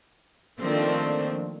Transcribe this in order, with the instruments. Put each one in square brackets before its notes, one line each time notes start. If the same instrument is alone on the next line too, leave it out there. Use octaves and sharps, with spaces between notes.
[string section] D#3 F3 A3 A#3 C4 D4